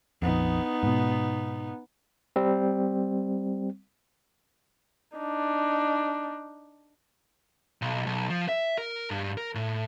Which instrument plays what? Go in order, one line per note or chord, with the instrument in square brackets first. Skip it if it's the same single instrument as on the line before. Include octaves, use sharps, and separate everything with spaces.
[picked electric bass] A#1 F2 [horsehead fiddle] B3 D#4
[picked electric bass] G#2 B2
[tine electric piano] G3 C4
[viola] D4 D#4
[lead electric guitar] B1
B1
F3
E5
A#4
G2
A#4
A2